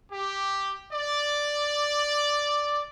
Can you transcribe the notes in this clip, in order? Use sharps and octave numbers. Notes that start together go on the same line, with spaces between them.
G4
D5